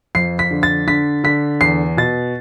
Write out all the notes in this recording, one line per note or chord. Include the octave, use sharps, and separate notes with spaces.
F2 C7
B6
D3
A6
D3 B6
D3 B6
E2 C7
B2 A6